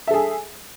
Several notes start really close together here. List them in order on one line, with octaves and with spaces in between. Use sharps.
E5 A4 G#4